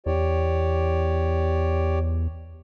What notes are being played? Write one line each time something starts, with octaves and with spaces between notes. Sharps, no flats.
E2 G4 C#5 D5